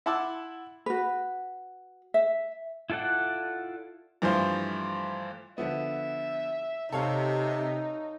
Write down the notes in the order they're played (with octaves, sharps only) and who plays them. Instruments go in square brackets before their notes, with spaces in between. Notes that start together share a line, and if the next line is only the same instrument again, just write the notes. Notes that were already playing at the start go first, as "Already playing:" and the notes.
[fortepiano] E4 F#5 A5 C6 D6 E6
[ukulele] F#4 B4
E5
[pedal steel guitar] E4 F4 A4 D5 F#5
[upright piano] G2 E3 F3 A3 C5 F5
[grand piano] D3 F3 B3 [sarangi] E5
[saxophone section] C3 [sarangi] D#4 [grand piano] A4 C#5 F5